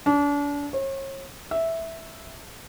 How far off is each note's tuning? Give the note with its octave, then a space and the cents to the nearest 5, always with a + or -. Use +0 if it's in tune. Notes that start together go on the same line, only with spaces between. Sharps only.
D4 -35
C#5 -40
E5 -5